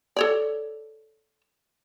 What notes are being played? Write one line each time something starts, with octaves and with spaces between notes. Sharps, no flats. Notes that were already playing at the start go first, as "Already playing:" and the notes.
A4 C#5 D5